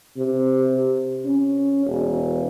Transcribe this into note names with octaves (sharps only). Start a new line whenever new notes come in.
C3
C#4
E1